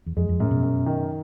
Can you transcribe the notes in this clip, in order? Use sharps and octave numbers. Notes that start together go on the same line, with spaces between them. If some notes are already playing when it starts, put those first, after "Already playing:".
E2
F2 G#3
F2
F#2 A2
B2
F#2
D#3